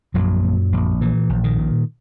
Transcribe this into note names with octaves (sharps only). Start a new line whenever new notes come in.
A#1 F#2 F#3
A#2
A#1
A#2 E3
A#1
D#3
A#2